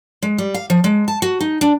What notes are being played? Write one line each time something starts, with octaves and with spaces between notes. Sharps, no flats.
G#3
G3
F5
F3
G#3
A5
F#4
D#4
D4